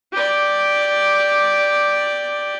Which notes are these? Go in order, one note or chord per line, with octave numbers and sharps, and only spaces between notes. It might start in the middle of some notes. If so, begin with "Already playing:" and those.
G4 D5